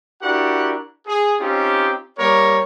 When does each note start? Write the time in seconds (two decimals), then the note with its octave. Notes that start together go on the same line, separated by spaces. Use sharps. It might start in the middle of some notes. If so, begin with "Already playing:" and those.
0.22 D4 E4 F#4 G4 A#4 F#5
1.07 G#4
1.40 C4 C#4 D#4 F4 G4
2.18 G3 A#3 G4 A#4 C#5